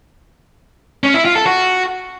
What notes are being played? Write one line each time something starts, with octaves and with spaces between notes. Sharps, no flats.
C#4
E4
F4
A4
F#4